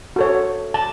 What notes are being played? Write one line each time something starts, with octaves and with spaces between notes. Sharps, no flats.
F#4 A4 C#5
A5